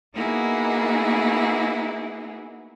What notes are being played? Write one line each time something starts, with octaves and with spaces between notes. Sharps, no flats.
A#3 B3 D#4 E4 F#4 G#4